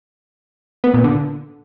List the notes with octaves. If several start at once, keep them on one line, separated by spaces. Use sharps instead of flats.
B3
A#2
D3